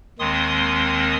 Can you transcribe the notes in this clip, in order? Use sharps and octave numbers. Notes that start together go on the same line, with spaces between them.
D#2 D#3 G#3 C4 C6 D#6